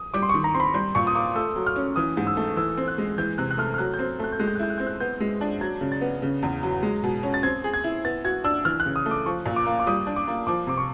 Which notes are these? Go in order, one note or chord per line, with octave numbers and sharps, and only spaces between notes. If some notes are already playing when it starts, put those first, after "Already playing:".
Already playing: D#6
G3 D6
C6
D#3 C#6
A#5
C4 C6
B5
G3 C6
A#2 C#6
D#6
A#3 D6
A3 E6
F#3
F6
C#4
E3 D#6
G#2
E6
A3
E3 E6
C4
F#6
G#3
E3 G6
C3 F#6
F#6
A3 F6
F6
F#3 F#6
G6
C4
A3 F#6
G6
G#3 F#6
G6
F#6
E4 G6
F#6
C4 G6
F#6
B3 G6
G#3
D4
F#3 G#6
C#3
A6
B3
C#3
E2
F#3
G#3
B2
C#4
A6
C4 G#6
G#4
G#6
E4
B3 A6
F#4 G#6
D4 E6
E3 F6
F#6
C#3
D#6
A3
D6
F3 C#6
A#2
D6
A#3
D6
G3 D#6
D4
D6
A#3
F3 D6
C3 D6
C#6